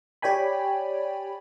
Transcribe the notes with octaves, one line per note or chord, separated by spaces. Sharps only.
G4 C#5 D5 G5 G#5 B5